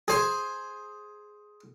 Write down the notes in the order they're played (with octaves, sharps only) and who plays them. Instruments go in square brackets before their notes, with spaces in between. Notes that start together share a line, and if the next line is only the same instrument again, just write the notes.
[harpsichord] G#4 C5